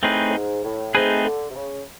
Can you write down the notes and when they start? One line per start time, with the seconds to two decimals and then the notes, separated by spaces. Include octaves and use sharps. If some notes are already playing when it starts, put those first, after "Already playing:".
0.03 A2 A3 C4 D#4 G#4 B4
0.29 A2
0.34 G#2
0.64 A2
0.95 G#2 A3 C4 D#4 G#4 B4
1.25 D3
1.50 C3
1.55 C#3